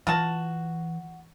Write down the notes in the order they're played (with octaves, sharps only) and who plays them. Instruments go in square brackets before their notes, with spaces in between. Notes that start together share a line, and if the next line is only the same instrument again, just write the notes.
[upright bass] E3 [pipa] F4 F#4 A5